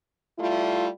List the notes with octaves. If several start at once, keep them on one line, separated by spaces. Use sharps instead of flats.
G3 A3 E4 F4